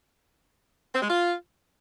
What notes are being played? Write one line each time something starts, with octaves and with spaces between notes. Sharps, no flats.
C4
G#3
F4